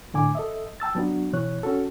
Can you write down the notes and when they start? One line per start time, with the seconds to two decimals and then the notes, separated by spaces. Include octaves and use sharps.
0.14 A2 D3 G#5 D6
0.35 A4 D#5 E5
0.80 G5 A5 E6 A6
0.95 F#3 B3 D4 F#4
1.33 B2 E3 C#5 F#6
1.63 C#4 F#4 A4